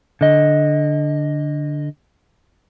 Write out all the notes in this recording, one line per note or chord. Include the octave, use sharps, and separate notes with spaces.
D3 D#5